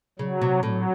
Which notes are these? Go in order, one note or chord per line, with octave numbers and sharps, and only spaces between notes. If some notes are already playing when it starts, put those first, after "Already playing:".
C#3 F#3
C3
A2 F#3